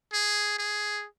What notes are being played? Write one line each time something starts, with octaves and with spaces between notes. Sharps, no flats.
G#4
G#4